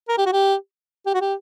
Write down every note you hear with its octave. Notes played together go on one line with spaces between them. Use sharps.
A#4
G4
F#4
G4
G4
F#4
G4